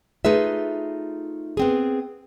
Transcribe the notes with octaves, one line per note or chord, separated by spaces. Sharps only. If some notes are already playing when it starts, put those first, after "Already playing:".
A3 D#4 F4 G#4 B4 E5
B3 C4 G#4